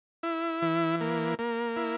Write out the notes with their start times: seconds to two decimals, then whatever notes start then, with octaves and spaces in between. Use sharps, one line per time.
0.23 E4
0.62 E3
1.01 A#3
1.39 A#3
1.76 E4